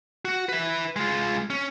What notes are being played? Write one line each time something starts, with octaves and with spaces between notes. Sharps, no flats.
F#4
B4 E5
G#3 F4
C#4